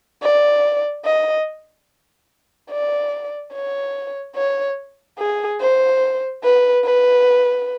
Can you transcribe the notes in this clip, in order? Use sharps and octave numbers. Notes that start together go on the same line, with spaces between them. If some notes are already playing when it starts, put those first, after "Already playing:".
D5
D#5
D5
C#5
C#5
G#4
C5
B4
B4